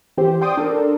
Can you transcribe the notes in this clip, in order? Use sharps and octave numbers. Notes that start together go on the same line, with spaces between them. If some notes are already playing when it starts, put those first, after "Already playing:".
E3 C4 G4 C5
D5 G5 C6 D6 D#6
D4 A4 A#4